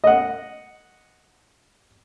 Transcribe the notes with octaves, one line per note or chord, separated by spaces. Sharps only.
D#5 F#5